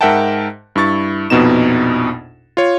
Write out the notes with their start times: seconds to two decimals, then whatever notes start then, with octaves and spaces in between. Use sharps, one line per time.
0.01 G#2 A#4 E5 F#5 G5 A5
0.76 G2 E4 C#6 A6
1.30 A#1 F2 B2 B3 D#4 E7
2.57 F4 C#5